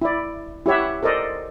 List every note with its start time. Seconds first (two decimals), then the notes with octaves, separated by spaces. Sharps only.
0.02 E4 D5
0.66 E4 G4 C#5 E5 F#5
1.03 A4 A#4 C5 D5 D#5